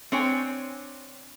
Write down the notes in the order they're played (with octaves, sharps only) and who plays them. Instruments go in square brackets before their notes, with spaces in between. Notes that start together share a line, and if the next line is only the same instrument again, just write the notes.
[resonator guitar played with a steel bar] C4 D4 C#5 G5 G#5